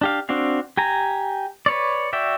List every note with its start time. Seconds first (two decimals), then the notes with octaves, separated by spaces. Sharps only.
0.01 D4 G4 F5
0.29 C4 D4 F#4 F5
0.77 G4 G#5 A#5
1.66 B4 C#5 D5
2.13 F#4 D5 E5 G5